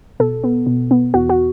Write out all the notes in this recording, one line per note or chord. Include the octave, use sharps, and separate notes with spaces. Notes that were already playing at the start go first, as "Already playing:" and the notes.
B2 A4
B3
B2
B3
E2 F#4
F#4